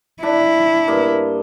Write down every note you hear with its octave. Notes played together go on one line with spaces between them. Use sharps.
D4 E4
G2 A#3 D#5